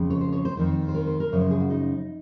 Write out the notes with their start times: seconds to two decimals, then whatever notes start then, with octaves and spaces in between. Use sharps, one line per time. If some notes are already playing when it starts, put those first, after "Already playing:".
Already playing: F2 C#3 F3
0.10 C#5
0.21 C5
0.32 C#5
0.45 C5
0.57 F2 D#3
0.88 C5
0.94 A#4
1.07 C5
1.20 A#4
1.32 F#2 C#3 F3 C#5
1.42 C5
1.51 G#4
1.60 F#4
1.70 D#4